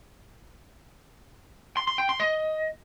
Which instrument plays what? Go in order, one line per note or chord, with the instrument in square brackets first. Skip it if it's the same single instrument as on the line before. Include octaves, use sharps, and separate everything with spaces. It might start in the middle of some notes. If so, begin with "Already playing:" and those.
[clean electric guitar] C6
C6
G5
C6
D#5